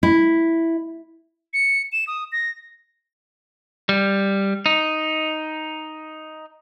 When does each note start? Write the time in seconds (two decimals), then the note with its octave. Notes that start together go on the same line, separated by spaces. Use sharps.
0.03 E4
1.53 C#7
1.92 E7
2.07 D#6
2.32 A#6
3.89 G3
4.66 D#4